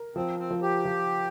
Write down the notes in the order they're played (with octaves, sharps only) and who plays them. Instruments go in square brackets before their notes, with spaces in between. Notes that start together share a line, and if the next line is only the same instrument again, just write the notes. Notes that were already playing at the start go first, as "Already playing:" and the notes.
Already playing: [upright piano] A#4
[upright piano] F3 [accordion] C4
[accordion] C4
[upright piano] F3
[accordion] G4
[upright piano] F3